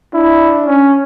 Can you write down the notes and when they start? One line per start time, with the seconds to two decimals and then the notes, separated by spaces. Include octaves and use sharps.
0.14 D4 E4
0.66 C#4